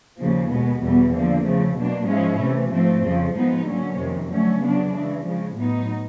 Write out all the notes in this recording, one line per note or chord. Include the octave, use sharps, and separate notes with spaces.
D#2 C#3 F3 A#3
B2 G#3 B3
E2 B2 G3 B3
D3 F3 A#3
C#3 F3 A3
B2 F#3 A#3 D4
G#2 F3 G#3 C#4 E4
C3 E3 A3
G#2 F3 A3 C4
F2 C#3 F3
G#2 F3 G#3 B3 D#4
D3 F#3 A#3 C#4
F2 C3 D#3
D3 F#3 A3 C#4
C#3 F#3 B3 D4
C#3 E3 G#3
C#3 F3 G#3
A2 F#3 B3 D#4